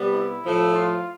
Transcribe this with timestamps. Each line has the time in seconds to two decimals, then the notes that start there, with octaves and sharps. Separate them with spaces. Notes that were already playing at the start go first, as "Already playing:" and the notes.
Already playing: C3 G3 B3
0.12 E4
0.43 A2 F3 A3
0.74 F4